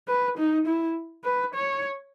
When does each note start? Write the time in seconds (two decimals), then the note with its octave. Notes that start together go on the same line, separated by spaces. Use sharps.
0.08 B4
0.38 D#4
0.67 E4
1.24 B4
1.54 C#5